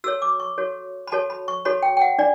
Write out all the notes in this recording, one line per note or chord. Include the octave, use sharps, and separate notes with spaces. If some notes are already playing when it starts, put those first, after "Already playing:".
F#4 A4 C#5 E6
D6
C#6
F#4 A4 C#5
B5
F#4 A4 C#5 A5
B5
C#6
F#4 A4 C#5 B5
G5
G5
F#5
D4 D5